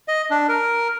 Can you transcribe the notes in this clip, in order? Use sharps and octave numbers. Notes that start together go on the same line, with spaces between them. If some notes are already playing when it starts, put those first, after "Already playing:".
D#5
D4
A#4